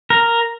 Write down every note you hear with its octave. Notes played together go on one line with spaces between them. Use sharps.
A#4